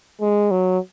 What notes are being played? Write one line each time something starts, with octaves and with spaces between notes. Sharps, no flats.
G#3
F#3